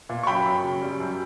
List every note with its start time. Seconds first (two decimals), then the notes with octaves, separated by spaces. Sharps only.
0.09 A#2
0.23 C#6
0.27 F#2 G5 B5
0.46 F#2
0.63 C#3
0.82 G3
1.00 F#2